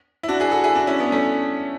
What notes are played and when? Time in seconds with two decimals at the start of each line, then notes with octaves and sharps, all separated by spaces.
0.23 E4
0.28 D4 F#4
0.40 E4 G#4
0.52 F#4 A4
0.64 E4 G#4
0.75 D4 F#4
0.87 C#4 E4
0.99 B3 D4
1.12 A3 C#4